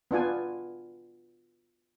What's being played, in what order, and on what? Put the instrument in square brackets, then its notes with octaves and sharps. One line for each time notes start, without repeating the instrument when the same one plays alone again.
[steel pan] B3 D4 F4 G#5